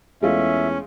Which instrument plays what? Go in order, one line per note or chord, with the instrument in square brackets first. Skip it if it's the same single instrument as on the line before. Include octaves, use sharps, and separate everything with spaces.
[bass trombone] E2 [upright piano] G#3 A3 F4 [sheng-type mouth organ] C#4 [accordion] E5